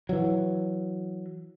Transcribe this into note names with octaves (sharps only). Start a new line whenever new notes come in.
E3 F#3